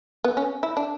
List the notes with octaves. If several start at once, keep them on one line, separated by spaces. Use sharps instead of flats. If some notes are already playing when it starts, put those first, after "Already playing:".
B3
C#4
E4
D4